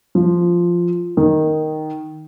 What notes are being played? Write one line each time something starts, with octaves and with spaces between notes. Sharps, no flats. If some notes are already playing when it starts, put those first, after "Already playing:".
F3
D#3